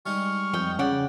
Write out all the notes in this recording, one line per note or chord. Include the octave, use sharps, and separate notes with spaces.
G3 G#3 D#4 C#6 F6
F2 D#5 G5
C#3 D5 F#5 G5